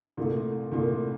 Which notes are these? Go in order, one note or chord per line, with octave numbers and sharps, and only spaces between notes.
C2 A#2 A3
C2 A#2 A3